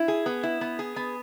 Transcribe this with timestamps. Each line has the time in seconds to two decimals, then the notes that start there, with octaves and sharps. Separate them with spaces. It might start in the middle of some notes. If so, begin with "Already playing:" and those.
Already playing: E4
0.08 G#4
0.26 B3
0.43 E4
0.61 B3
0.79 G#4
0.96 B3